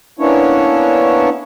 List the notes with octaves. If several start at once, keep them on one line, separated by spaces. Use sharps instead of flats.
A#3 B3 C#4 D4 E4 C#5